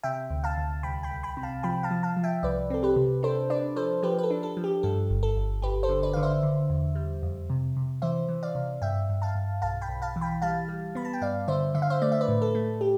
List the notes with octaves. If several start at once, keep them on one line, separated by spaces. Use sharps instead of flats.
C3 E5 G5
D2
F5 A5
D2
C2 G5 B5
G5 B5
C2
G5 B5
C3
F5 A5
F3 G5 B5
F5 A5
F3
F5 A5
F3
E5 G5
C2 B4 D5
C4 A4
G4 B4
C3
D4 A4 C5
D4 B4 D5
F3 A4 C5
F3 G4 B4
B4
A4
D4
A4
F3
G4
G2 A4
G1
A4
G1
G1 G4 B4
A4 C5
D3
B4 D5
D3 F5
C5 E5
D3
E2
G3
F2
C3
C3
E3 C5 E5
E3
D5 F5
C3
G2 E5 G5
G2
F5 A5
G2
B1 F5 A5
G5 B5
B1
F5 A5
E3
G5 B5
G3 F5 A5
G3
B3 B5
A5
G5
G2 D5 F5
D3 C5 E5
D3 E5
F5
C5 E5
A3 D5
E5
B4 D5
A2
A4
A3
G4